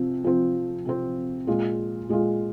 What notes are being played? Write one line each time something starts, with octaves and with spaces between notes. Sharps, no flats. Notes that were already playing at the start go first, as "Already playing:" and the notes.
Already playing: C3 F3 C4
C3 F3 C4
C3 F3 C4
A#2 G#3 F4
A#2 G#3 F4